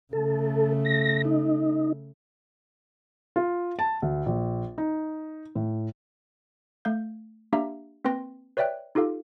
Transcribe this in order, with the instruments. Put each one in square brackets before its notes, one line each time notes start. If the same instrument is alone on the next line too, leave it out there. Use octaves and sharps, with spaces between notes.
[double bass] C#3 A3 [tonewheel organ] A4
[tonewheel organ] A#6
D#4
[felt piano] F4
A5
D2
A#1
D#4
A2
[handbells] A3 F5 G6
A#3 D4 G4 E5 F5 A#5
A#3 C4 B4 G5 C6 A#6
B4 C#5 D5 E5 G5 F#6
D#4 F4 G4 A4 F5